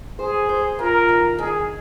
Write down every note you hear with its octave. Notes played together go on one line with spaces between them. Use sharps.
G#4 C5
C5
F4 A#4
D#3
D#3 G#4